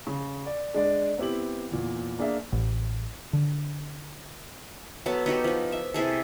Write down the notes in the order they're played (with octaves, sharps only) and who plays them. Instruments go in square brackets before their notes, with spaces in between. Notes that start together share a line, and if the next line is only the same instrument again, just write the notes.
[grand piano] C#3
D5
G#3 D4 D5
B3 C4 E4 G4 F#7
E2 A#2
A#3 D4 G#4 E5
[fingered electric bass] A1
D3
[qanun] F#3 B3 A4 A5
B3 D#4 F#4 G4
F3 D#4
E5
C3 E4 G#4 A4